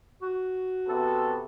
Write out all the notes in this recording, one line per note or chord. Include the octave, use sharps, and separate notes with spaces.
F#4
C3 B3 A4